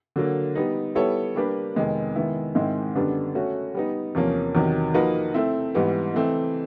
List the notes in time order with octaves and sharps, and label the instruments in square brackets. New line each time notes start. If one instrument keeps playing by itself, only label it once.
[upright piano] D3 F#3 A#3
G3 B3 D#4
G3 B3 E4 A4 C#5
G3 A#3 D4 G4 B4
F2 C3 D#3 G#3 B3
D#3 G#3 B3 E4
G#2 D#3 G#3 C4 E4
F#2 D3 G3 B3 D4
A3 C#4 F#4
G3 B3 D#4
E2 C3 F3 A#3 C#4
E2 C3 D#3 F#3
F3 A#3 D#4 F#4 B4
A3 C4 E4
G#2 E3 G3 B3
E3 A3 C4